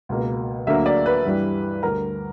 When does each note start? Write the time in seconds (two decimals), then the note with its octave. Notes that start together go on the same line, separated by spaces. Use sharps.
0.09 C#2 B2 A#3
0.67 D2 D3 F#3 A#3 E5
0.86 D5
1.06 B4
1.25 G2 E3 G3
1.83 D2 D3 G3 A#4